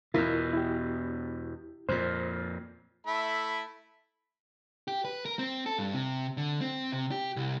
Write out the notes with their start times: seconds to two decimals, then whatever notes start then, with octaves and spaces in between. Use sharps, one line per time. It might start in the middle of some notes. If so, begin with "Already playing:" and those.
0.14 E2 B2 E4 F4 A#4
0.53 E4 G4
1.89 F2 A#2 C5
3.07 A3 E4 B5
4.88 G4
5.05 B4
5.25 A#4
5.39 C4
5.66 A4
5.78 G2
5.94 C3
6.37 D3
6.61 C4
6.92 C3
7.11 G4
7.36 C2